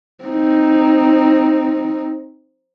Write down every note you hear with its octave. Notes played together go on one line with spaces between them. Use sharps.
C4 D#4